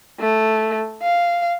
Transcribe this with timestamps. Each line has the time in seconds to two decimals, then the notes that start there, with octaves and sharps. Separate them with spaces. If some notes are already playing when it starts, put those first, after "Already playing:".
0.20 A3
1.02 F5